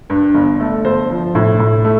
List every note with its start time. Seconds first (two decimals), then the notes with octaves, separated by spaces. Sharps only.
0.10 G2
0.34 G1
0.60 A3 A4
0.85 G1 C5
1.10 F3
1.35 A2
1.59 A2
1.84 A3